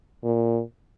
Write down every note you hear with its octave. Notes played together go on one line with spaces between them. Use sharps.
A#2